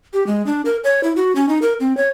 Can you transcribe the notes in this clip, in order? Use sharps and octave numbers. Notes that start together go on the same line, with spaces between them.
G4
G#3
D4
A#4
C#5
E4
F#4
C#4
D#4
A#4
C4
C#5